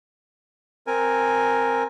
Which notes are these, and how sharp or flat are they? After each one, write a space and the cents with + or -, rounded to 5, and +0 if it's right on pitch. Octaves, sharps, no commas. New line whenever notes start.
C4 +0 A#4 +0 G#5 +0